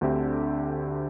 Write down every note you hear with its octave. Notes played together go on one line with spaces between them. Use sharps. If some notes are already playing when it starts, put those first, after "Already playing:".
D2 D3 C4 G4 E5